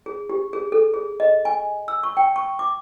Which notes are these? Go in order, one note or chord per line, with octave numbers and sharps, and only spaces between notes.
G#4
G4
G#4
A4
G#4
D#5
G#5
E6
C#6
G5
C#6
D6